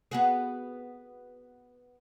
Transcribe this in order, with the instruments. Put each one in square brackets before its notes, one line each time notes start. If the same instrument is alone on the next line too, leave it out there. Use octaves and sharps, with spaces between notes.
[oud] B3 F#4 G#4